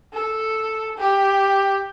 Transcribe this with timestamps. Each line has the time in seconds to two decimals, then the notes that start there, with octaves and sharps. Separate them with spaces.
0.13 A4
0.98 G4